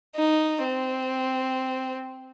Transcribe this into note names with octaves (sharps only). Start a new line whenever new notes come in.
D#4
C4